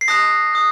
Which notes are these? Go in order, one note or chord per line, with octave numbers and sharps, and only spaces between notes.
C7
A5 D#6 F#6 A#6
D#6 F#6